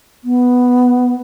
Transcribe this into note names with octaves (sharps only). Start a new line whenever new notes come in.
B3